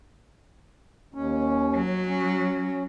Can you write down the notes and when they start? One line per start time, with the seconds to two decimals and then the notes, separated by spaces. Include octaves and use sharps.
1.14 D#2 C#4
1.76 F#3
2.08 C#4